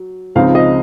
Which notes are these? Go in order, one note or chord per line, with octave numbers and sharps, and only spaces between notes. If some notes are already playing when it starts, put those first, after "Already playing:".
Already playing: F#3
C#2 C#3 F3 C4 D#4 F5
D#5